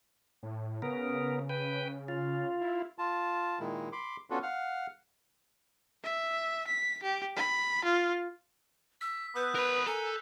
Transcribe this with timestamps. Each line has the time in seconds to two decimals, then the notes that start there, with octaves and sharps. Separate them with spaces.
0.43 A2
0.82 C#3 B3 A#4
1.49 B4 G5
2.08 F4
2.61 E4
2.98 F4 A5
3.60 A#2 D#3 G#3 E4
3.92 B5 C6 D6
4.30 B3 C#4 D4 F4 F#4 A4
4.43 F5 F#5 F6
6.04 E5
6.67 B6
7.03 G4
7.36 B5
7.84 F4
9.01 E6 B6
9.35 B3 B4 E6 F#6 G6
9.55 A#4 B4 B5 F7
9.87 A4 A#4 G#5